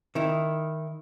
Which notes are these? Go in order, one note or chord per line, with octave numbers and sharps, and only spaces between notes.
D#3 E4